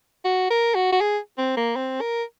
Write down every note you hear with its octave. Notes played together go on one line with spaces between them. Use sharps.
F#4
A#4
F#4
F#4
G#4
C4
A#3
C4
A#4